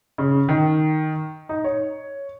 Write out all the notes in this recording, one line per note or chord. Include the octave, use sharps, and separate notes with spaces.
C#3
D#3
D#4
C#5